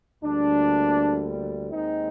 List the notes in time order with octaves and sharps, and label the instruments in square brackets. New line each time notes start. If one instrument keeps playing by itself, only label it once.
[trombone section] D2 D3 G3 A#3 D4
D#2 D#3 G#3 C4 D#4